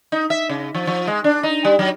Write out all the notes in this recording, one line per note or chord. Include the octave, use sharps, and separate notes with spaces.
D#4
E5
C#3
F3
F3
G#3
D4
D#4
G3
F#3